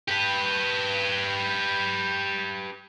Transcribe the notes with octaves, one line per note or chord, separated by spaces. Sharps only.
G4 B4